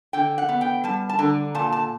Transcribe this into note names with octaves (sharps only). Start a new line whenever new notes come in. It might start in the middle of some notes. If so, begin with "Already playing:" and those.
D3 G5
F#5
B3
G5
G3 A5
A5
D3 A#5
A#2 A5
A5